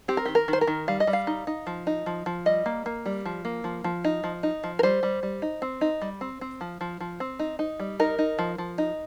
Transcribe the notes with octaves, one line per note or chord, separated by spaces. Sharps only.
C4 G4
A#4
D#3 G4
A#4
D#3
C5
A#4
D#3
G3 F5
D#5
G3
F5
D#4
D#4
F3
D#4
F3
F3
G3 D#5
A#3
A#3
G3
F3
A#3
F3
F3
D#4
F3
D#4
F3
A#4
G3 C5
G3
G3
D#4
C4
D#4
G3
C4
C4
F3
F3
F3
C4
D#4
D#4
G3
D#4 A#4
D#4
F3
F3
D#4